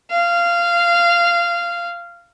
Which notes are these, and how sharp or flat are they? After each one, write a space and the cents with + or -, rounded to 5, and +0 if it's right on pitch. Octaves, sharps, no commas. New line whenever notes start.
F5 -15